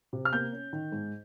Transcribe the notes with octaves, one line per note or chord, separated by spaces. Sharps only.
C3
F6
A#3 G6
C#4
D#3
G#2